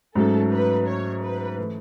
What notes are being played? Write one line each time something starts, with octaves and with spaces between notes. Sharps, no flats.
G#2 F#3 A3 C#4 A4
B4
C#5
B4
E3 A3 E4 A4